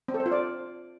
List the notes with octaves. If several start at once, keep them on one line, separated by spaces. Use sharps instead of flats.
C4
A4
C5
F4
D5